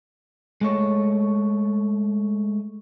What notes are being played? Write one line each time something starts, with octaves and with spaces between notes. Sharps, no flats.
G#3 A3 C#5